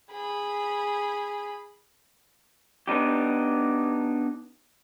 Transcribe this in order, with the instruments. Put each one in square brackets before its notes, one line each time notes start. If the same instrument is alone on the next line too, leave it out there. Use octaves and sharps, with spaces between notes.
[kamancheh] G#4 B5
[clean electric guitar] B3 D4 D#4 G4